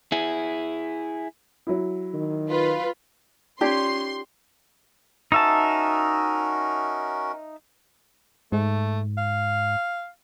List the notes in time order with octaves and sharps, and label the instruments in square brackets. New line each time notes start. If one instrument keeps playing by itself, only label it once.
[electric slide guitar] E4 G#4
[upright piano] F#3 E4
[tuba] D#3
[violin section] F4 B4
[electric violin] C#4 [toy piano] D#4 F4 D5 [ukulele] G4 [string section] C6
[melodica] C#4 F#4 A#4 [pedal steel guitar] D#4 E5 A5
[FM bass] G#2 [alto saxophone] A3
[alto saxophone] F5